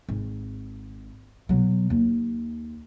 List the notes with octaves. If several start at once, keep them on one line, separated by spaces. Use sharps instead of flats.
G#1
B2 F#3
D#2